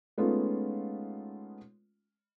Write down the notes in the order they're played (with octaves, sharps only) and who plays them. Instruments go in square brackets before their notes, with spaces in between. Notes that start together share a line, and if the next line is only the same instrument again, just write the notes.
[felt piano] G#3 A3 B3 C#4 D#4 F4